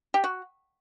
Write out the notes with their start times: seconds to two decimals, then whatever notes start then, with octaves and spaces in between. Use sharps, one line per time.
0.14 G4
0.24 F#4